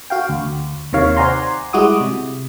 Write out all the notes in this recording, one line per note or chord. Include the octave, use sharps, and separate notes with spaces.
F#4 F5 G5
D2
D#2 C3 D#3 C#5 F5
C5 D5 F#5 G#5 A#5 C6
G3 G#3 E4 F#4 D6 D#6
C3